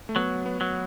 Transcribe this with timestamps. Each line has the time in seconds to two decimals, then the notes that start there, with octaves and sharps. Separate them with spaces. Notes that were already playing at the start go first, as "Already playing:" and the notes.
0.09 A3
0.16 F#3 B3
0.46 B3
0.61 F#3